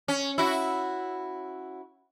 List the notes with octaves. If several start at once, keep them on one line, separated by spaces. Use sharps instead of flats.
C#4
E4 F#4